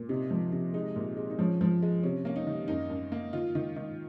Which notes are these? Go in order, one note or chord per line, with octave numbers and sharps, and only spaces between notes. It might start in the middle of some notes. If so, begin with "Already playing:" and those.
Already playing: A#2
C3 D#4
F3
C3
G#3 D#4
A#2
G#3
D#4
F3 C#4
F3
G#3
C3 C#4
A#3 C#4
D#4
D#3
F#2 D#4
F#2
A#3
D#3 F4
D#3
D#3